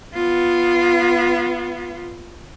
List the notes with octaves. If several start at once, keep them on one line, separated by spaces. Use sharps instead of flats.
B3 F4